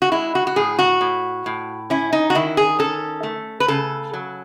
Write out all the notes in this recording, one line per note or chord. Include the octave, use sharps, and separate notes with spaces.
F#4
G#3 E4
F#4
F#4
A2 G#4
F#4
A2
A2
C#4 E4
D#4
F#4
D#3 E4
G#4
C#4 A4
A3
B4
C#3 A4
F#3